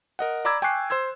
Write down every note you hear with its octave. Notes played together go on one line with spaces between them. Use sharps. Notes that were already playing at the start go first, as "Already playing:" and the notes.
A#4 D#5 F#5
D5 A#5 B5 D6 E6 G#6
G5 G#5 C#6 D6 F#6 C7
C5 C6 E6 G#6